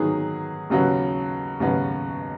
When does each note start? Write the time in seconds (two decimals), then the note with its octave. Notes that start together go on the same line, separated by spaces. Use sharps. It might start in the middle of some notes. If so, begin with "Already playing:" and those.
Already playing: D#3 F#3 B3 D#4 G#4
0.70 D#2 C#3 F#3 B3 F#4
1.60 D#2 C#3 F#3 B3 F#4